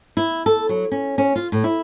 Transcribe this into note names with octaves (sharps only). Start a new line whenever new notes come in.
E4
A4
F#3
C#4
C#4
F4
A2
E4